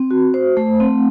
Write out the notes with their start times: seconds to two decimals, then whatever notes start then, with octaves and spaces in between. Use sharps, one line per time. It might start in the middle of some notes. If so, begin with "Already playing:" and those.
Already playing: C4
0.11 F#4
0.34 C5
0.57 A3
0.80 C4